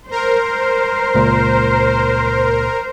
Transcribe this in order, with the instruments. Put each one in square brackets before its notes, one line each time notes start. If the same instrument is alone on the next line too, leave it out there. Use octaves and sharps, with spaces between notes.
[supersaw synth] A#4 [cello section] C5
[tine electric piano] C#2 A#2